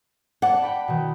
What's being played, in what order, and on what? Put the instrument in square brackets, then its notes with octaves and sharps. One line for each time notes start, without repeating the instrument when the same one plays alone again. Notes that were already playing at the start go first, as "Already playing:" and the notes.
[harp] D5 A5 D6 [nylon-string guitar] F#5
[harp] G5 B5
B2 D#3